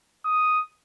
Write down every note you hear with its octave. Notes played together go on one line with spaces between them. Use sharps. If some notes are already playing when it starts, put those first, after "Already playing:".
D#6